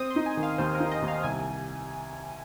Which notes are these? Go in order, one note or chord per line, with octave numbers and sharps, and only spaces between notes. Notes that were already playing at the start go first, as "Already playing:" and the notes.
Already playing: C4 D#6
C6
D#4
G#5
D#3
F5
D#2 C5
A#4
D#4
D#5
D#2
F5
C2 G#5